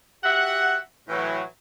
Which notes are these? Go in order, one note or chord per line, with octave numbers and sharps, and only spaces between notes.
F#4 G4 E5 F#5
A2 E3 F#3